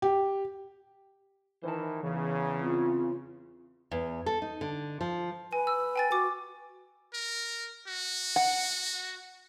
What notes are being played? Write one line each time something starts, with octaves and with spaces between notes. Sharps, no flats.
G4
D#3 E3 C5 A5
E2 C#3 E3
C4 F4
E2
A4
D#4
D3
F3
B4 G#5
E6
G5 G#5 A6
F#4 D6
A#4
F#4
F#5